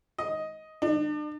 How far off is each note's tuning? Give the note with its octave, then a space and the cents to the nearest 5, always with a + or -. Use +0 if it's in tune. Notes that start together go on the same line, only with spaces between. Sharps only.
D#5 +10
D4 +40